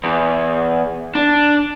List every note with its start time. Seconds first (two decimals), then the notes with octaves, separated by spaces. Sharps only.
0.04 E2
1.15 D4